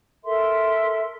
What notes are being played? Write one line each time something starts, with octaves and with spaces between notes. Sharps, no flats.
A4 A#4 E5 C6